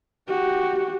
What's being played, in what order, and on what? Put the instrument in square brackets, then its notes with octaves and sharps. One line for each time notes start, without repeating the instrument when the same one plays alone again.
[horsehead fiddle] F#4 G4